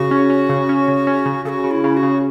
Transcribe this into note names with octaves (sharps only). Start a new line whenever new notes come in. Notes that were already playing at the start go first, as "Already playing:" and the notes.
Already playing: C#3 F#4
C#4
C#4
C#3
C#4
C#3
C#4
C#3
C#3 F#4 A4
C#3
E4
C#3
F#4
C#3